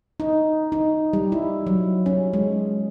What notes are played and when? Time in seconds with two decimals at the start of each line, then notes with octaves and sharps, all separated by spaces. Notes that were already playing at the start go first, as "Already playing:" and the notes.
0.20 D#4
0.72 D#4
1.13 G3
1.32 E4
1.67 F#3
2.06 C#4
2.33 G#3